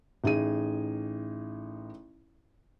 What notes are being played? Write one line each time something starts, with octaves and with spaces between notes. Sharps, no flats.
A1 D#4 G#4 D#7